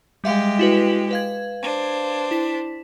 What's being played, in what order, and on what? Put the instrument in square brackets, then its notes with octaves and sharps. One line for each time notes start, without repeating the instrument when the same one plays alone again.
[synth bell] G3 E5 F5 [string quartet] G#3 G4
[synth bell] E4 F#4 B4
B4 F5 G#6
[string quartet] D4 C5
[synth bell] E4 B6